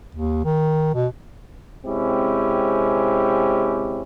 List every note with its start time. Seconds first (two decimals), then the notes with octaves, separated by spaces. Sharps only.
0.15 D#2
0.44 D#3
0.94 B2
1.85 C3 G#3 C4 C#4 E4 G4